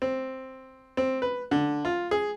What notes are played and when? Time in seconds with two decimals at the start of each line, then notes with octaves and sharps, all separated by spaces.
0.02 C4
0.97 C4
1.22 B4
1.51 D3
1.85 F4
2.11 G#4